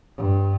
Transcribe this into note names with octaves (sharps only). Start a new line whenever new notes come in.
G2